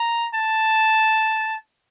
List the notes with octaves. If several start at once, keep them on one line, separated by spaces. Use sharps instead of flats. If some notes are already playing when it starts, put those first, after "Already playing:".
Already playing: A#5
A5